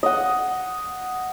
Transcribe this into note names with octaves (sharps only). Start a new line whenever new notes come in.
D#5 F#5